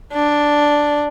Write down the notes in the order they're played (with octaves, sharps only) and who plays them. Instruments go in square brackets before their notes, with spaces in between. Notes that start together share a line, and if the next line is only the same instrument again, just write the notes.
[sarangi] D4